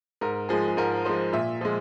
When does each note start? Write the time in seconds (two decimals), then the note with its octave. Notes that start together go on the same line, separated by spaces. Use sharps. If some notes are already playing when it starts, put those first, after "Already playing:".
0.21 G#2 A#4
0.49 F3 G#3 G#4
0.68 G#4
0.77 G#2 A#4
1.05 F3 G#3 C5
1.33 A#2 E5
1.61 F3 G#3